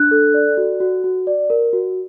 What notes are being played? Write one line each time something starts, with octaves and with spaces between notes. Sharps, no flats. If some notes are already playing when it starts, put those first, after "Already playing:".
Already playing: D4 F#6
A4
D5
F#4
F#4
F#4
D5
A#4
F#4